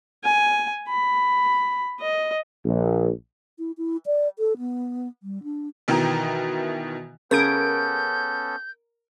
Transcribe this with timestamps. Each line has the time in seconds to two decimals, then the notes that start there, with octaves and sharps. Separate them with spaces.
0.24 G#5
0.89 B5
2.01 D#5
2.65 A#1
3.59 E4
3.78 E4
4.06 D5
4.39 A4
4.58 B3
5.23 G3
5.43 D4
5.88 B2 D#3 E3 E4 G5 A#5
7.31 C#3 B3 C#4 A4 A#4 G6 G#6 D7